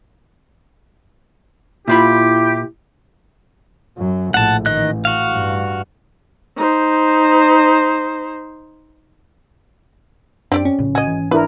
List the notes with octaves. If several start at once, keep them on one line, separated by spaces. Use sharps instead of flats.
A#2 E4 F4 G4 B5
F#2 F#3
A#1 A2 F#5 A5
A1 D#3 D#5 F#6
F#4 F5
G2
D#4 C5
F#2 C4 D4 G4 D5
C#4
A#1 A2 C#3
F#4 D#5 G#5
G#1 E3
D4 E4 A#4 B4